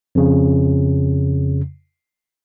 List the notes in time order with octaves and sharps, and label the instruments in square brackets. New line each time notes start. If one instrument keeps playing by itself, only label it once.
[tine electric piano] F2 C#3